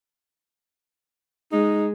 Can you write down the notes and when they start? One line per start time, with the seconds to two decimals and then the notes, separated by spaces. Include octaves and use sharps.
1.52 G#3 D#4